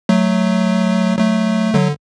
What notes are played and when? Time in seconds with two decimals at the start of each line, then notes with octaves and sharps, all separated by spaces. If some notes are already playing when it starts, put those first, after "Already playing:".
0.09 F#3 A3
1.18 F#3 A3
1.74 D3 F#3